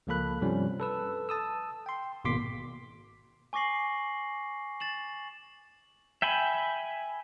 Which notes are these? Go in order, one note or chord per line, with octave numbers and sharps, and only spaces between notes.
C#2 F3 A#3 A4 B5 F#6
G2 C3 F3 G3 C#4
A4 B4 E6
A5 D#6 E6
G5 C6
G#1 B2 A#3 C6 D6 B6
G#5 C#6 D6 A#6 C7 F#7
A6 E7 F#7
E5 G5 G#5 B5